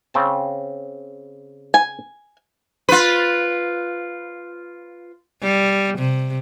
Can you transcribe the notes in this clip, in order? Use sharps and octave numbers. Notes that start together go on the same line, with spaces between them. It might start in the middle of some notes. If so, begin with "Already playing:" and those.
C#3 C4 A5
G#5
F4 B4
G3
C3